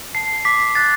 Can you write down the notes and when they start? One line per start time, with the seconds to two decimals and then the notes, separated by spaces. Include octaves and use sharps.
0.15 A5 C7
0.45 D6 B6
0.75 F#6 A6